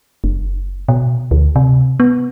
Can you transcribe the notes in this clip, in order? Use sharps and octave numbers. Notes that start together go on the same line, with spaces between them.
F#1
B2
D2
C3
B3